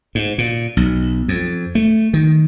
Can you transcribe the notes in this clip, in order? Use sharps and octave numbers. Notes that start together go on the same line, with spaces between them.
G#2
A#2
B1
F2
A3
D#3